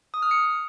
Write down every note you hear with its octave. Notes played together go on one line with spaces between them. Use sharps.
D#6
F6
C#7